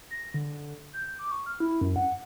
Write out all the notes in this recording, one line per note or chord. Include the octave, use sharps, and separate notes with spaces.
A#6
D3
G6
D6
C#6
F6
E4
F#2
F#5